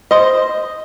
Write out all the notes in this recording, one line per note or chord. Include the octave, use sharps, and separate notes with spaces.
C5 D#5